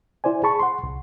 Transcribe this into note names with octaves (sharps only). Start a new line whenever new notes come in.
E4 C5 D5 G#5
G#4 A5 B5 C#6
F#5 C6
C2